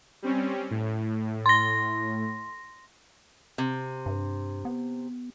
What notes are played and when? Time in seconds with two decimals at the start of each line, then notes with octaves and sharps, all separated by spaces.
0.23 G3 C4 C#4
0.71 A2
1.46 C6 A#6
3.58 C3
4.06 G2
4.65 B3